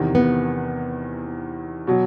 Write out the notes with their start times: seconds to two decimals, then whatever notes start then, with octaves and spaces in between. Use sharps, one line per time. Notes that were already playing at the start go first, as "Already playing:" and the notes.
Already playing: E2 C3 D#3
0.15 B3
1.87 B2 F#3